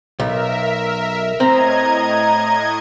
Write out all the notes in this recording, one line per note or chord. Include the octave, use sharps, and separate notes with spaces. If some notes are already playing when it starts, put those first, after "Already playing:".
B1 A#4 E5
A2 C4 D#5 A#5 G#6